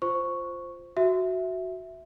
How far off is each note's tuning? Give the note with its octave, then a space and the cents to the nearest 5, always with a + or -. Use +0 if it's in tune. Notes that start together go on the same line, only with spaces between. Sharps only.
F4 +0 C5 +0 C#6 +0
F#4 +0 E5 +0